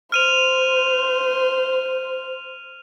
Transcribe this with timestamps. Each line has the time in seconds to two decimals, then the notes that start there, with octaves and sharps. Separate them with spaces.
0.12 C5 F6 D#7 F7